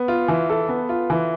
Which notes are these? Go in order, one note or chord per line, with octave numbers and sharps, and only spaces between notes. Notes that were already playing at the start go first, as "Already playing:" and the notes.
Already playing: B3
F4
E3
A4
B3
F4
E3